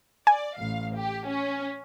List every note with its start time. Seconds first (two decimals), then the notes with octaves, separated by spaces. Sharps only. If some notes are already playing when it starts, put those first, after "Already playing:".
0.27 D5 G#5
0.57 A1 F5
0.95 G4
1.27 C#4